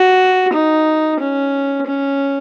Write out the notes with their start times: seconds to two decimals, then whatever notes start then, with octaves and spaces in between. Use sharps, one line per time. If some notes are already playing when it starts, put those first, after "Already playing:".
Already playing: F#4
0.53 D#4
1.20 C#4
1.87 C#4